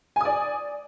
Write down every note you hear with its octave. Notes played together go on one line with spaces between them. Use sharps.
D5 G#5 D#6